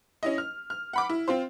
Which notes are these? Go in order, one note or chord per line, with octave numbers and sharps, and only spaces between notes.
C#4 E4 D#5
F6
F6
F#5 B5 D6
E4
C4 F4 C5